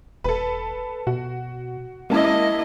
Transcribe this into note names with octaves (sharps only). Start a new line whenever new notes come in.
E1 A4 B4
B2 F#4
G#3 A#3 C#4 E4 D#5 A5